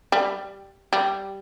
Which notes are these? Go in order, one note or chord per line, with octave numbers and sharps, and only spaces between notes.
G3
G3